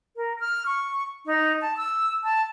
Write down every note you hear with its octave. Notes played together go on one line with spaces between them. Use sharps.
A#4
F6
C#6
D#4
A5
E6
A5